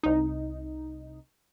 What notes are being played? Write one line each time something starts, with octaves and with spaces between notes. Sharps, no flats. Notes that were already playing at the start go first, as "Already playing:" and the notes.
C2 D#4